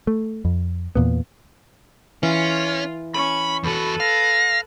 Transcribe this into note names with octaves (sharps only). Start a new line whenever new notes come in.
A3
F2
E2 A#2 B3
E3 C#4 F4
C#4 B5 C#6
E2 F#4 A4 B4 B5
F5 A#6